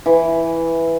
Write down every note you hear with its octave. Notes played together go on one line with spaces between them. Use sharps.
E3